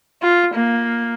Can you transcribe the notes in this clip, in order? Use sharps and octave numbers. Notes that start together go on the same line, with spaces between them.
F4
A#3